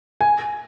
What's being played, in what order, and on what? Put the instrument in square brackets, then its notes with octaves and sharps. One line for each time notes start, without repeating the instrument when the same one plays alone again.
[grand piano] G#5